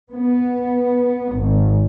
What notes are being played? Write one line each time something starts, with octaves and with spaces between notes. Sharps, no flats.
B3
G#1